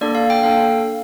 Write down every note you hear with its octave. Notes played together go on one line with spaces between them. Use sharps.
A#3 D4 A4 D5
F5
G5
A#3 D4 A4 F5